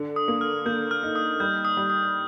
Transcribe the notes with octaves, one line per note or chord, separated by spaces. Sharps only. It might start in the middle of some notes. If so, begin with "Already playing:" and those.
Already playing: D3
D#6
A#3
F6
A#3 G6
F6
D#4
D#6
G3 G6
D#6
G3
D#6